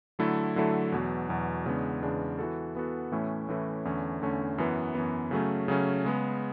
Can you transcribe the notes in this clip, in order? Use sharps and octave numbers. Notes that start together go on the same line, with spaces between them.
D3 F#3 A3 E4 A4
D3 F#3 A3 E4 A4
E2 B2 F#3
E2 B2 F#3
E2 C#3 G#3 B3 D4
E2 C#3 G#3 B3 D4
E3 B3 F#4 A4
E3 B3 F#4 A4
A2 E3 A3 C#4 E4
A2 E3 A3 C#4 E4
E2 D3 A3 C#4
E2 D3 A3 C#4
F#2 E3 B3
F#2 E3 B3
C#3 F#3 A3 C#4
C#3 F#3 A3 C#4
C#3 G#3 B3